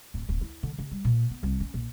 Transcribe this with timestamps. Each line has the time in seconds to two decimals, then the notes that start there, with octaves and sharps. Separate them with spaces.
0.14 D1
0.29 D1
0.41 E4
0.63 D3
0.78 C#3
0.91 G3
1.04 A#2
1.30 B3
1.43 C2
1.60 C#4
1.74 A#1